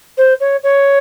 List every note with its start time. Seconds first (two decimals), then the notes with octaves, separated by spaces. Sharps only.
0.17 C5
0.40 C#5
0.63 C#5